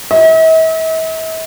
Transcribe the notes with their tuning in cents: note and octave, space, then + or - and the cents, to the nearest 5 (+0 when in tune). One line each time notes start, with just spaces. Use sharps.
E5 -45